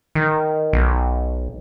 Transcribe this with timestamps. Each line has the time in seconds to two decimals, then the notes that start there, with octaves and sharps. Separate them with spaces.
0.15 D#3
0.73 B1